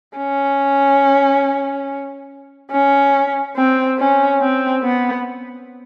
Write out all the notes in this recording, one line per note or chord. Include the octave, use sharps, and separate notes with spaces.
C#4
C#4
C4
C#4
C4
B3